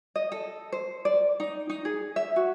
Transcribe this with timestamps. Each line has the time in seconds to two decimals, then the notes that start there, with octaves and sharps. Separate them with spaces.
0.16 D#5
0.32 A4
0.72 C5
1.05 D5
1.40 D#4
1.70 D#4
1.85 G#4
2.16 E5
2.36 F#4